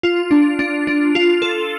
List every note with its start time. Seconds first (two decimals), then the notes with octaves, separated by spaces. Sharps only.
0.03 F4
0.31 D4
0.59 D4
0.87 D4
1.15 F4
1.42 A4